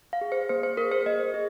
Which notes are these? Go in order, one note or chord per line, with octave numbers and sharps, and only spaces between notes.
F5
G#4
C5
A#3 C5
C5
G#4 A#4
C5
A#3 D#5
G#4